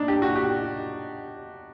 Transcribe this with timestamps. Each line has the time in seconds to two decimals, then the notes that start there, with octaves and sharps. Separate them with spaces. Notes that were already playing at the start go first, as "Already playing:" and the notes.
Already playing: D4 D#4
0.08 G4
0.22 F#4
0.36 G4